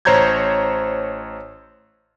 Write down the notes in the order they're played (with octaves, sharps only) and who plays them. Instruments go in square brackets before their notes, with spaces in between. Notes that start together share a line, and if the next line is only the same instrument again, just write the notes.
[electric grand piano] A1 C5 C#5 A#5 G6 G#6